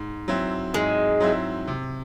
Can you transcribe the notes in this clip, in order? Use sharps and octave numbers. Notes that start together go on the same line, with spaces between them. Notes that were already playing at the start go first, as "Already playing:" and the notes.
Already playing: G#2
F#3 C4 E4
G#2 G#3
F#3 C4 E4
C3